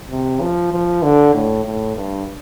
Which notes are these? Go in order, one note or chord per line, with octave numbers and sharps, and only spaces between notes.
C3
F3
F3
D3
A2
A2
G2